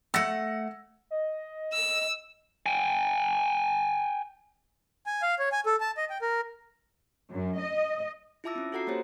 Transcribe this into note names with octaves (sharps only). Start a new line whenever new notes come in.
A3 F#5 E6 A#6 C#7
D#5
E6
G5 G#5
G#5
F5
C#5
G#5
A4
A5
D#5
G5
A#4
F#2
D#5
E4 F4 E5 A5 D6 E6
C4 C#4
F4 F#4 A4 F#5 A#5 C7
A#3 C4 G4 C5 C#5